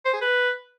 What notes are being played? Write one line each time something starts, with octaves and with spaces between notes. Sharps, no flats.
C5
G#4
B4